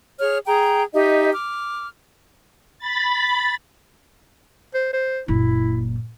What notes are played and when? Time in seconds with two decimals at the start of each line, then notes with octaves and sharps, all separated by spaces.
0.19 G#4 C#5 F6
0.46 G#4 G5 A#5
0.94 D#4 G4 D#5 E5
1.33 D6 F6
2.79 B5 A6
4.74 C5
4.93 C5
5.28 F#1 A#2 E4